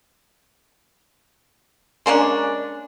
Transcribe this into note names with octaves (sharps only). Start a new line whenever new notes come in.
G#3 A#3 C#4 D4